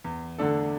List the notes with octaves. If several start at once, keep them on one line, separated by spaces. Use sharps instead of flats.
E2
D3 A3 D4 A4